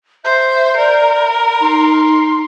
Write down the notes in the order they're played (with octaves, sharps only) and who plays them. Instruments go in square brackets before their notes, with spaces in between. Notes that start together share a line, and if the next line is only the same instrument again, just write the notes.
[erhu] C5 [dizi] E5 [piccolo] G6
[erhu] A#4 [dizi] D5
[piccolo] B5
[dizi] D#4 [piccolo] C6